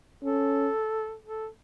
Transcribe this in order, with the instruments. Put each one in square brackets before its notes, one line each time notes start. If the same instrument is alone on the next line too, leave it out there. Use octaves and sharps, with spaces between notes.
[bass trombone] C#4 [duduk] A4
[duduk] A4